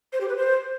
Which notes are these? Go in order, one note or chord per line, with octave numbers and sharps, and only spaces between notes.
C5
G4
B4
C5